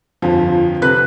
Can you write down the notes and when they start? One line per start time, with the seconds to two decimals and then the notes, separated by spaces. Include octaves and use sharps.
0.22 G1 F2 F3
0.82 C3 B4 F#6